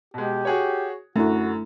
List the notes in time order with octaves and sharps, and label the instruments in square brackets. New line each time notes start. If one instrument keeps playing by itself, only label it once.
[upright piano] B2 G#3 [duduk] G4
[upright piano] F#4 G#4 C#5
[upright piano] F#2 [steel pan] A3 D4 E4 [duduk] F#4